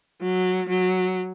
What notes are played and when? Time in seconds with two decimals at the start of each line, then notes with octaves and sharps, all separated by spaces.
0.22 F#3
0.69 F#3